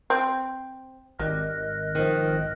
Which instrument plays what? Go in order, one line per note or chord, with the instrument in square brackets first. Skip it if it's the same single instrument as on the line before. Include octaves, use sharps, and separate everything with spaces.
[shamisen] C4
[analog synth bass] G#1 [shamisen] G3 [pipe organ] A#4 D#5 F#6
[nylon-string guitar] D#3 F3